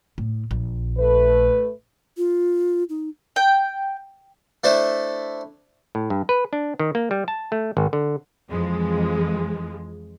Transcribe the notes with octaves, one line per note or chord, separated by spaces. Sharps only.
A2
A#1
A3 B4
F4
D#4
G5
A3 D4 E4 C5
A2
G2
B4
D4
D#3
A#3
G3
A5
A3
G#1
D3
F2 E3 F3 G#3